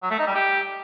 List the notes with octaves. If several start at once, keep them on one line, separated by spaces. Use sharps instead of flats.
F#3
A3
D#4
G3
G4